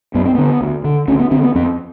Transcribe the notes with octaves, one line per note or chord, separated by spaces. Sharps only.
F#2 B3
C4
D3 B3
D2
D3
D2 C#4
B3
D3 C4
B3
F2 C4